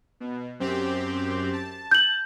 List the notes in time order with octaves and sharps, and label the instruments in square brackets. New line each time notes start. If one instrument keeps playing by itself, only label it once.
[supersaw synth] B2
F#2 C4 G4
A5
[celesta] G6 F#7